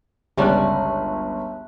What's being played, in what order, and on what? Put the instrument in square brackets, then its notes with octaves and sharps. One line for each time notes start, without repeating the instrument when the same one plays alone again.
[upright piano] G1 C#2 [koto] G3 C#4 D5 [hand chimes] E5 A5 F#6